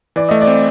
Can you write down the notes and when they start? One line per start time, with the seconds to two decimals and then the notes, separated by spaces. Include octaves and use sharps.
0.16 E3 D5
0.29 A3 D#5
0.41 D5
0.47 C4